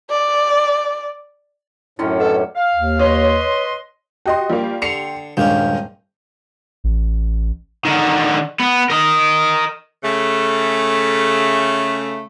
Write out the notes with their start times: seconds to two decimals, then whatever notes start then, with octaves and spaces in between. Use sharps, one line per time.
0.10 D5
1.99 F#2 A2 D3 D#3 C#4 E4 F6
2.20 A4 B4 D#5 F#5
2.55 F5
2.74 D#2
2.99 B4 C#5 D#5 C6
4.26 F#4 G4 D#5 G5 C6
4.49 F3 G3 A#3
4.82 D3 C7 C#7 F7
5.37 D#1 G2 G#3 A#3 C#4 D4 F5 G6
6.84 A1
7.85 D3 D#3
8.60 B3
8.90 A#4 D#5
10.03 C#3 A3